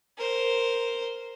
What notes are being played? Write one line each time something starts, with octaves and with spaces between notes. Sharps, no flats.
A#4 C5